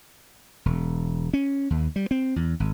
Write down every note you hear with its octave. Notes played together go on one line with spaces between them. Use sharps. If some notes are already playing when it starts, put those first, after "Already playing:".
E1
C#4
D#2
G3
C4
E2
G#1